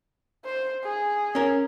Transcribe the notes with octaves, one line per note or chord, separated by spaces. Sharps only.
C5
G#4
C#4 A#4